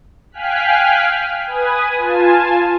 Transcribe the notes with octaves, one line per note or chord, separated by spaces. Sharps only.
F5 G5 G#5 F6 F#6 B6
B4 G#5 D#6
F4 G#5 A5